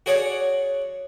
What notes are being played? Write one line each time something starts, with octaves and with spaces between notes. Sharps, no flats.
F#4 G#4 C#5 D5 F#5